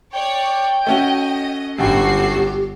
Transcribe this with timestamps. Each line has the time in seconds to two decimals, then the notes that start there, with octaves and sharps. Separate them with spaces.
0.13 C#5 D5 G5
0.87 A3 C#4 F#4 D#5
1.78 G1 F#2 D3 F#4 G4 A4 G5 C7